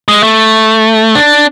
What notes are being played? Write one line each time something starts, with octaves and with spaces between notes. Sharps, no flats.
G#3
A3
D4